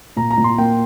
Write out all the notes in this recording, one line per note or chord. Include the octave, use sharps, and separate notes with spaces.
A#2 A#5
A#5
A#2
C6
A#3 G5